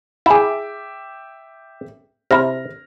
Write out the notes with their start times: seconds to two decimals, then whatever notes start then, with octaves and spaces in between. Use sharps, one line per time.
0.26 E4 G#4 E5 G5 D6
2.31 C3 E4 F6 A#6